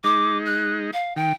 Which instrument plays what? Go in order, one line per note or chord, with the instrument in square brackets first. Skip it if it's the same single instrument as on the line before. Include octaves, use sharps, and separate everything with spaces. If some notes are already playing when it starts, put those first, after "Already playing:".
[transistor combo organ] G#3 D#4 [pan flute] D6
[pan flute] F#6
F5
[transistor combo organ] D#3 [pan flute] G5